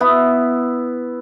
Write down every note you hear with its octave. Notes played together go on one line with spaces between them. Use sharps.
B3 E4